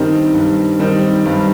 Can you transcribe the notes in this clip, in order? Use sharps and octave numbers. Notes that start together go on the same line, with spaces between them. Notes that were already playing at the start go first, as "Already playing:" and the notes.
Already playing: G2 D#3 G3 C4 D#4
G2
D#3 G3 C4 D#4
G2